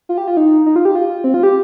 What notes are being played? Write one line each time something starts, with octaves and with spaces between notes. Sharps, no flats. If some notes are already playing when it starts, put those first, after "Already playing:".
F4
G4
F4
D#4
D#4
F4
G4
F4
C4
F4
G4